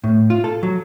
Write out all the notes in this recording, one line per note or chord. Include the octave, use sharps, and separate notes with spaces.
A2
F4
A4
F#3